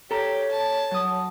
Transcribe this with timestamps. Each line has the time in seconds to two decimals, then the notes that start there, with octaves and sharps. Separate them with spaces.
0.11 G4 A4 C#5 A#5
0.51 A5
0.91 F#3 D#6